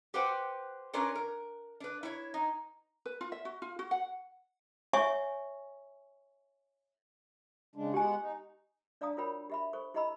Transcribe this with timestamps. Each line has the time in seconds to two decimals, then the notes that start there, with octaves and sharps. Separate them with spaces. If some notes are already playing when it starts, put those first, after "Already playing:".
0.14 G4 B4 C5 F#5 G5
0.93 C#4 D4 F4 A#4 B4 C#5
1.15 A#4
1.80 D4 B4
2.03 E4 C#5
2.34 D#4
3.06 B4
3.21 F4
3.32 E5
3.45 F#4
3.62 F4
3.79 F#4
3.91 F#5
4.93 C#5 E5 G#5 C#6
7.75 C#3 G#3 D4
7.94 G#3 B3 G4 F#5 G#5
8.21 D#4
9.01 D4 D5 F5 A5 A#5 D#6
9.17 F4 F#4 A#4 C#5 G5 B5
9.50 G4 E5 B5
9.73 A4 C5 C#6
9.94 E4 G4 D#5 A#5 B5 E6